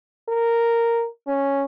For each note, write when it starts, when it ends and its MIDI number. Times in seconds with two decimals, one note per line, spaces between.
0.29 1.07 70
1.27 1.65 61